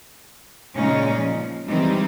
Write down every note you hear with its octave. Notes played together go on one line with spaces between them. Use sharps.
A#2 C#3 G#3 C#4 D#4
F3
D#3 E3 G3 G#3 C4 D#4